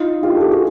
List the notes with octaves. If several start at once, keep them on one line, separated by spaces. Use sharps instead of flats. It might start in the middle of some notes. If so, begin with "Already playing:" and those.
Already playing: D#4 F4
F4 G4
G4 A4
F#4 G#4